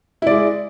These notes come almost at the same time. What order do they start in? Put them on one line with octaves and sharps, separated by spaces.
E4 D5 G#3